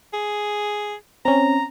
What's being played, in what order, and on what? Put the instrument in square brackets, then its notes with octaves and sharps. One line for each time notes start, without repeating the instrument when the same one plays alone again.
[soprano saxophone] G#4
[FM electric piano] C4 C#4 [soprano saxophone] A#5